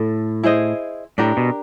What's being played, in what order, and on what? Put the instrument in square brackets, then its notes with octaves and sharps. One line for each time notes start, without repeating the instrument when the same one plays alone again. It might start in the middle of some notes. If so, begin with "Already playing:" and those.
Already playing: [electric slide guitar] A2 [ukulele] A4
[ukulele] E4 G#4 C5 D#5
[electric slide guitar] A2 [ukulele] D4 G4 A#4
[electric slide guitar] B2